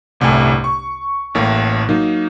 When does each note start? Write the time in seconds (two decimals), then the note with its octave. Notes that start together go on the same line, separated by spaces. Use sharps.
0.20 G1 C2 A2 A3 G#5
0.64 C#6
1.35 A1 A2 A#3
1.89 F#3 A#3 D#4